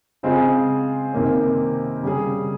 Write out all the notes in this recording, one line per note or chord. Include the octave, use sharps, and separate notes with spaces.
C#3 G#3 C4 F4 G#4
C3 D#3 A#3 C#4
C#3 G3 C#4 G#4